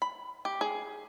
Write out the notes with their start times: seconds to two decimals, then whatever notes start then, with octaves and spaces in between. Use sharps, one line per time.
0.02 B5
0.45 G4
0.61 G#4